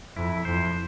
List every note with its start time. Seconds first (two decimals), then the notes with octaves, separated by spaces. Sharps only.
0.16 F2 E4
0.45 F2 C5